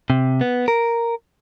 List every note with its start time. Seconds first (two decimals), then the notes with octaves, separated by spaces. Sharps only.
0.10 C3
0.41 B3
0.68 A#4